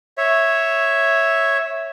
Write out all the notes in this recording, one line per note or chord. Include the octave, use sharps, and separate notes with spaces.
C#5 E5